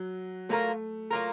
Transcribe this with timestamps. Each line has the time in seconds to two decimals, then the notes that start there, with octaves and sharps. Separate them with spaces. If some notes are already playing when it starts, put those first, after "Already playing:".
Already playing: F#3
0.49 F#3 A3 A#3 F4 A#4
1.11 F#3 A#3 F4 A#4